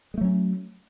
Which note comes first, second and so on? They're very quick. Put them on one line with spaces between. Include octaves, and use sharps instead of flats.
G#3 A3 F#3 C#4